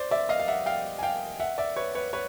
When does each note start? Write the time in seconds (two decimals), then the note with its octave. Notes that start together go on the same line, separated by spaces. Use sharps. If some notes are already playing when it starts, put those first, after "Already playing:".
Already playing: C5 D5
0.11 D5 E5
0.29 D#5 F5
0.39 F5
0.48 E5 F#5
0.66 F5 G5
0.99 G#5
1.03 F5 G5
1.40 E5 F#5
1.58 D5 E5
1.76 B4 C#5
1.95 B4 C#5
2.13 B4 C#5